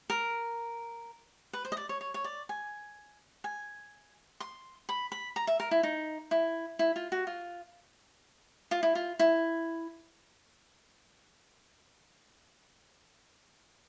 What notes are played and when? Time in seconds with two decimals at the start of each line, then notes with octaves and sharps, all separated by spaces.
0.10 A#4
1.53 B4
1.65 C5
1.72 D#5
1.77 D5
1.89 C#5
2.01 C#5
2.14 C#5
2.24 D5
2.49 G#5
3.44 G#5
4.40 C6
4.89 B5
5.12 B5
5.36 A#5
5.47 E5
5.60 A#4
5.71 E4
5.83 D#4
6.31 E4
6.79 E4
6.96 F4
7.12 F#4
7.27 F4
8.71 F4
8.83 E4
8.95 F4
9.19 E4